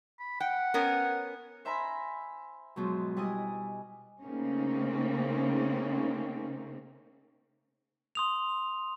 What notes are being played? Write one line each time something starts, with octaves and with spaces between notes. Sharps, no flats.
B5
F#5 G5
B3 C#4 A#4
C5 E5 G#5 A#5 B5
G#2 B2 F3 F#3
G3 E4 D#5 G#5 D#6
C#3 A3 A#3 C4 C#4 D#4
C6 D#6 F7